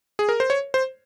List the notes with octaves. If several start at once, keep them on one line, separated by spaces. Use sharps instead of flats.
G#4
A#4
C5
C#5
C5